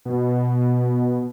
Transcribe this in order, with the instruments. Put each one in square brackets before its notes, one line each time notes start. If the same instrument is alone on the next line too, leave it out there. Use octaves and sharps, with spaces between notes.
[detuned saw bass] B2